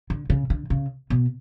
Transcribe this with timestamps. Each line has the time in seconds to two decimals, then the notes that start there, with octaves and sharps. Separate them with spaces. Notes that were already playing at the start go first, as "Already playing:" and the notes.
0.10 D3
0.30 C#3
0.50 D3
0.70 C#3
1.10 B2